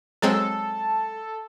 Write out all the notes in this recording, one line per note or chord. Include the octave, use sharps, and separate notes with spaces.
F#3 G#3 C4 A4